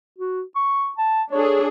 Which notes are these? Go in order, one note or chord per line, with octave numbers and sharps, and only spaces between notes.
F#4
C#6
A5
D4 G#4 A4 C#5